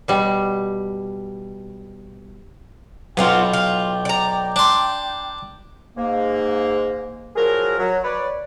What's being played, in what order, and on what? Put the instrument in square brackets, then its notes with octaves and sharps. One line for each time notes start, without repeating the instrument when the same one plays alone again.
[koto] B2 G3
[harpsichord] B1 [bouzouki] B3 C4 F4 [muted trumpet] G5
[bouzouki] F4
D5 A#5
[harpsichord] D4 C6
[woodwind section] G#2 A#3
F3 F#3 G#4 A#4
F#3
B4 C#5 D5